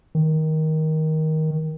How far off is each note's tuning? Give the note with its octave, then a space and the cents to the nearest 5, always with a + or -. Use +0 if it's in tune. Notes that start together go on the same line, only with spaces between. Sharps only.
D#3 +15